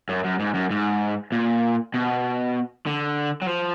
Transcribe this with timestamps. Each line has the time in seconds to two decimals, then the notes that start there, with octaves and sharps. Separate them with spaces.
0.09 F#2
0.25 F#2
0.40 G#2
0.55 F#2
0.71 G#2
1.32 A#2
1.94 B2
2.86 D3
3.42 F#3
3.47 F3